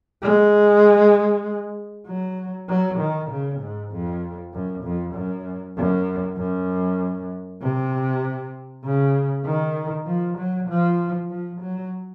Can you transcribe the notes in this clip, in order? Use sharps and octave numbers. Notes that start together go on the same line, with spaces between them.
G#3
F#3
F#3
D#3
C#3
G#2
F2
F#2
F2
F#2
F#2
F#2
C3
C#3
D#3
F3
F#3
F3
F3
F#3